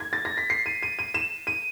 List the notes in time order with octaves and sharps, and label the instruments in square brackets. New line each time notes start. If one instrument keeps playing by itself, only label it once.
[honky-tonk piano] G#6
A6
A#6
B6
C7
D#7
D#7
D#7
E7
D#7